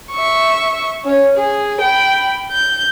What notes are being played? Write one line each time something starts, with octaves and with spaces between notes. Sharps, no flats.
E5 C#6
C#4 C#5
G#4
G5 B5
G6